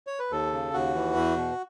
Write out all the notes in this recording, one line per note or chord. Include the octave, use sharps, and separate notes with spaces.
C#5
B4
D#2 A4
C#3
D#2 F#4
E3
E2
B2